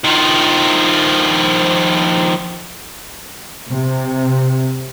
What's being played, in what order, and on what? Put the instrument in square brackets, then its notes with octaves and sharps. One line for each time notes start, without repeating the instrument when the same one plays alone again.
[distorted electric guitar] D#3 F3
[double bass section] C3